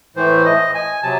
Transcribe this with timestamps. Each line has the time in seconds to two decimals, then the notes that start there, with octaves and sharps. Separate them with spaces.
0.16 A2 E3 A3 C5
0.45 D#5
0.74 G#5
1.03 C3 F#3 A5